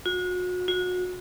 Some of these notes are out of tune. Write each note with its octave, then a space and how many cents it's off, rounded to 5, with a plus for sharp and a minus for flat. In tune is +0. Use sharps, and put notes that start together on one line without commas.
F#4 -35
F#4 -30